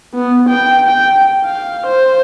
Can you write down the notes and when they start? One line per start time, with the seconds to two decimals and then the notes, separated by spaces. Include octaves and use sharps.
0.14 B3
0.49 G5
0.86 G5
1.45 F5
1.86 C5